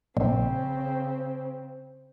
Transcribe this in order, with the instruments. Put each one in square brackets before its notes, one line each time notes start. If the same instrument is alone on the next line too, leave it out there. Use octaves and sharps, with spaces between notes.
[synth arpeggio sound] A#1 [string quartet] C#3 C4